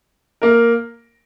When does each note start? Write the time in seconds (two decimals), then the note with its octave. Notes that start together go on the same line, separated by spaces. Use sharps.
0.42 A#3 A#4